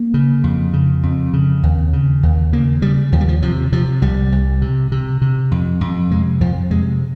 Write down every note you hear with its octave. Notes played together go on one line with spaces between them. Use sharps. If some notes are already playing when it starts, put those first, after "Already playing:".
Already playing: A#3
C#3
F2
C#3
F2
C#3
D#2
C#3
D#2
C#3 A#3
C#3 G3
D#2 F3
G3
F3
C3 F3
C3 F3
C2 G3
C2
C3
C3
C3
F2
F2
C3 G#3
F2 F3
C3 G#3